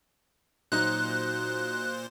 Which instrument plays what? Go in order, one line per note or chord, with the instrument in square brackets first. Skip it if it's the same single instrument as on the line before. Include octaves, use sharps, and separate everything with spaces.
[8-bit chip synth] A#2 C5 [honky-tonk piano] F#3 D#4 [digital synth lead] F#6